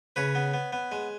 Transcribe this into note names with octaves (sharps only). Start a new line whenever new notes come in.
C#3 B4 C#5
B3
B3
B3
G#3